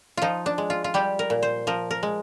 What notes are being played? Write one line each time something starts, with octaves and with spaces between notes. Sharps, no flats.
F3 D#4 F4
D4
G#3
F4
F4
G3 G4
A#4
A#2
C5
F3 A#4
A#4
G#3